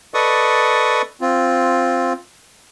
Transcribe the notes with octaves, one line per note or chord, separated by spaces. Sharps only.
A4 B4 D5 D#5 C#6 D#6
C4 F4